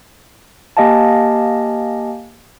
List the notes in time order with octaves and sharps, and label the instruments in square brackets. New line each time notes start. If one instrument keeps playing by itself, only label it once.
[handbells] A#3 G4 D#5 F5 G#5 A5